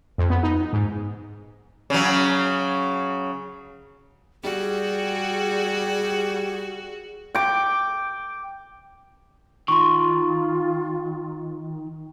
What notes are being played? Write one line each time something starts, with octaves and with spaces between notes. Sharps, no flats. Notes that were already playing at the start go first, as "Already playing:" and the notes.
F2
B3
D#4
G#2
C#3 F#3
G3 F#4 G#4
G5 D6
D#3 F4 C6 C#6